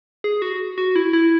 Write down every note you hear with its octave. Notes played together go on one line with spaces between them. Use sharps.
G#4
F#4
F#4
E4
E4